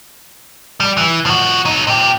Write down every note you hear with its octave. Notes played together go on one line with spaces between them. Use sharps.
G3
E3
F3 F#4
F#3 D#4
A#2 G4